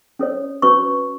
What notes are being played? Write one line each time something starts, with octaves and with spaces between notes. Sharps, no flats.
C#4 A4 C#5
C#4 F#4 B4 C#6